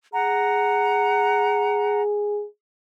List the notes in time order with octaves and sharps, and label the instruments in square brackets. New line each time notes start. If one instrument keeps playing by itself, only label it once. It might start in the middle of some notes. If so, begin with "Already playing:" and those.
[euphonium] G#4 [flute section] F#5 A#5